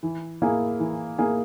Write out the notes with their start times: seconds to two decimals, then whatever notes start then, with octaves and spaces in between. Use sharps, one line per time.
0.03 E3
0.42 A#3 E4 G#4
0.80 E3
1.18 A#3 E4 G#4